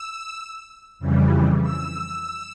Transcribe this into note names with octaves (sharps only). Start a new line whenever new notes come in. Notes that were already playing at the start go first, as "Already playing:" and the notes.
Already playing: E6
F2 C#3 E3 G3
E6